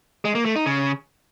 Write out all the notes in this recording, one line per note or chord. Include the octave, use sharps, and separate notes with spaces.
G#3
A#3
A3
D#4
C#3